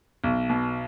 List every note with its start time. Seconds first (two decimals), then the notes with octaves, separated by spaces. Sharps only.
0.24 B1
0.50 B2